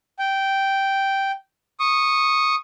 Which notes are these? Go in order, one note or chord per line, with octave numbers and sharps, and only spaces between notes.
G5
C#6 D#6